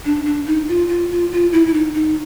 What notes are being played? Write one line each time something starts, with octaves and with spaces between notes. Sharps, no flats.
D4
D4
D#4
F4
F4
F4
F4
E4
E4
D#4
D#4